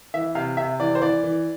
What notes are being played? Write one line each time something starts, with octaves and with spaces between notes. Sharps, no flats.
E3 E5
C3 F5
C3 E5
E3 D5
C5
E3 D5
E3